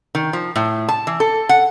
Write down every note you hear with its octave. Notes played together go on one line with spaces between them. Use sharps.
D#3
F3
A2
A5
E3
A4
F#5